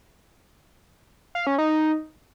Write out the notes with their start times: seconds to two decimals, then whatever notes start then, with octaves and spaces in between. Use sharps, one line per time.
1.35 F5
1.47 C#4
1.58 D#4